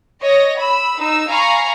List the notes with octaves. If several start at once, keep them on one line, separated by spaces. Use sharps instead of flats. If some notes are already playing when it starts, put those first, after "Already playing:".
C#5 D#5 A#6
B5 E6
D#4 E6
F5 G#5 A#5 B5 C#6